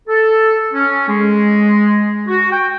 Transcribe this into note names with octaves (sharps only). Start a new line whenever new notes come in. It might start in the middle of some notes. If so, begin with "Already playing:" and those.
A4
C#4
G#3
F#4
G5